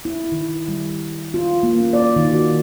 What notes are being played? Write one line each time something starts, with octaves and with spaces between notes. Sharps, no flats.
E4
D#3
G3
F4
A#3
C#4
D5
D#3
F#4